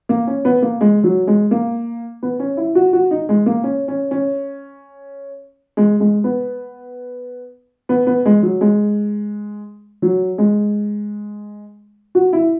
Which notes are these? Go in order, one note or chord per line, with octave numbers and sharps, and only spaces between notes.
A#3
C#4
B3
A#3
G#3
F#3
G#3
A#3
B3
C#4
E4
F#4
F#4
D#4
G#3
A#3
C#4
C#4
C#4
G#3
G#3
B3
B3
B3
G#3
F#3
G#3
F#3
G#3
F#4
E4